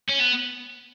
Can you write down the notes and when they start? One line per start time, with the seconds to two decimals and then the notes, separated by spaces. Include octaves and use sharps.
0.09 C#4
0.20 B3